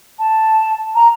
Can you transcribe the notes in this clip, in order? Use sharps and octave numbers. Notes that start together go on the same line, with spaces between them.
A5
A#5